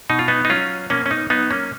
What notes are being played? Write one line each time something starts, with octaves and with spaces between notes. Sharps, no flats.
B2 D#4
F4
B3 D#4
D#4
F#3 C#4 F4
B2 A#3 C#4
C#4
B3 D#4
F#3 B3 D#4
A#3 C#4